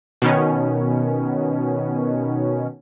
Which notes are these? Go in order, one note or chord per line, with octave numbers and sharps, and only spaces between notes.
B2 D#3 C#4